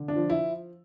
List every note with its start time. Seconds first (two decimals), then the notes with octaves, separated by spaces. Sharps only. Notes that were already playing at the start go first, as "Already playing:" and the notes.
Already playing: D3
0.08 D4
0.16 F3
0.30 E4